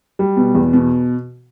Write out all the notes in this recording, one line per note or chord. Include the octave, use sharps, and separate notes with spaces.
G3
B2
E2
B2